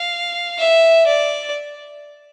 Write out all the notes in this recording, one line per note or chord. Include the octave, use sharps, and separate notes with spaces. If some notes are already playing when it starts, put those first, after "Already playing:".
Already playing: F5
E5
D5